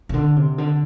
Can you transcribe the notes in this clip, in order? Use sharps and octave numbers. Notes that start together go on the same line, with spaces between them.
C3
D3
C3
D3